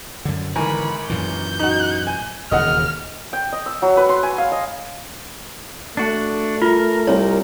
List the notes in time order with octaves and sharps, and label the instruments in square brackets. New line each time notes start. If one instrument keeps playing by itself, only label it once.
[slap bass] F#2 D3
[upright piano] G#1 A#4 G#5 [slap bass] D3 E3 [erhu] B5
[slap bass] F#2 A#2 E3 [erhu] G6
[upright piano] D#4 F#4
G#5
[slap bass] E1 D#2 C#3 [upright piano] D#5 F#5 [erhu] F6
[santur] G5
D#5
E6
F#3
B4
C6
G#5
F5
D#5
[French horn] A3 [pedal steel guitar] D4 F#4
[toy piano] F4 [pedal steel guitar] A#4
[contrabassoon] C2 [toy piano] C#5